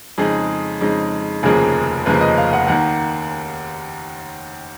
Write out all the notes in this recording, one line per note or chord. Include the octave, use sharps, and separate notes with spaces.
F2 C#3 G#3 D#4 G#4
F2 C#3 G#3 D#4
F1 D#2 C#3 F3 A#3 G#4
F1 D#2 C#3 F3 A#3 B4
D#5
F5
F#5
D#2 D#3 A#3 F#5